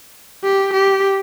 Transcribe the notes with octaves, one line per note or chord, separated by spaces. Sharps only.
G4
G4